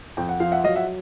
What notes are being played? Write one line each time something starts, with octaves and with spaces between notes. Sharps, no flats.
F2 G5
F#5
F3 F5
E5 F#5
F#3 D#5 F5
E5 F#5